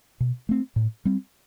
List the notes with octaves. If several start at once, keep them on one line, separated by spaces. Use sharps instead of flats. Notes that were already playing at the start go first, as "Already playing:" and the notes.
B2
A3 C4
A2
G3 C4